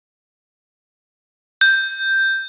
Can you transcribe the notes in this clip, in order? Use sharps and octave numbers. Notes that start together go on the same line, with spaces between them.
G6